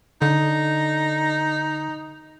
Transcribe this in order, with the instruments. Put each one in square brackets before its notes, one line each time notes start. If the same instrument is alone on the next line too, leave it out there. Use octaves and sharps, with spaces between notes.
[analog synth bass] D3 [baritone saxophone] D#4